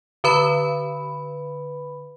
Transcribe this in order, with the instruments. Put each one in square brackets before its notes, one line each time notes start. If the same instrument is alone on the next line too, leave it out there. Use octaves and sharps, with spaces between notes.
[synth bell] D3 B4 B5